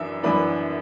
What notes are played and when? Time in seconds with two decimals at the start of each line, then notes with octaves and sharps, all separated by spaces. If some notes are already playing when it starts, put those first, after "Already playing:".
Already playing: F#2 E3 D4 E5
0.23 F#2 E3 B3 D4 B5